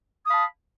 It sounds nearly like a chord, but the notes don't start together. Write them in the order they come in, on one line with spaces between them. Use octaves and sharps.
D#6 B5 F5 A5